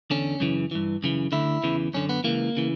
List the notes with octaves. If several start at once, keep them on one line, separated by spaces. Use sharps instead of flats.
E2 D3 C#4
F#2 C#3 E3
G2 E3
F#2 C#3 E3
D2 D3 E4
E2 C#3 E3
F#2 D3 C#4
B3
C#2 C#3 E3 A#3
C#3 E3